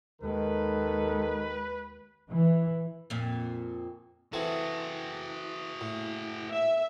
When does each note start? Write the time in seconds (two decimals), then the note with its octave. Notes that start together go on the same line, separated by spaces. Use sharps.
0.22 D#2 D#3 G#3 A4 B4
2.28 E3
3.10 F2 A#2
4.33 E3 C4 F#4 G#4 A4
5.81 A2
6.51 E5